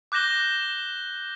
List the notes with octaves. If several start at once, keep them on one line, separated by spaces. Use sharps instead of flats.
D6 F#6 G6 A#6 E7 G7